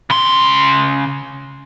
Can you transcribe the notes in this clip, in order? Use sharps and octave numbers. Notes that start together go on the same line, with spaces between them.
C#3 C6